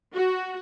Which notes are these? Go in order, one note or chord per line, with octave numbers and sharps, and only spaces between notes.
F#4